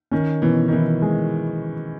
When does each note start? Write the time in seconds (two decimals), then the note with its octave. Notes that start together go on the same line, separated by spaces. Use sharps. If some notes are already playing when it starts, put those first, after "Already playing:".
0.11 D#3 C#4
0.42 B2 E3
0.68 D#3
0.72 E3 E4
1.02 G#3